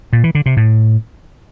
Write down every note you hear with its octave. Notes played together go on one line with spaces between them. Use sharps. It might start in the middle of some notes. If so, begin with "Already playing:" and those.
A#2
E3
D3
C3
A2